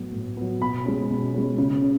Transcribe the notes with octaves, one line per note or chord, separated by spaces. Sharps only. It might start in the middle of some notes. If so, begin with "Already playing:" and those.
Already playing: A2 F#3 B3
A2
F#3 B3
B2 B5
G#3 C#4
B2
G#3 C#4
C#3
C#4